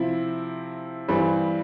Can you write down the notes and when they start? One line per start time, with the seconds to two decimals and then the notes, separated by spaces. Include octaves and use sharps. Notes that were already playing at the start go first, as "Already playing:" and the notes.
Already playing: C3 F3 C4 E4
1.08 G2 E3 G3 C4